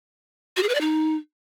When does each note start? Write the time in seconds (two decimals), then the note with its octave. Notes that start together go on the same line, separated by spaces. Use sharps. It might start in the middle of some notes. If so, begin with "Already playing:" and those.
0.57 F#4
0.63 G#4
0.69 B4
0.75 D5
0.81 D#4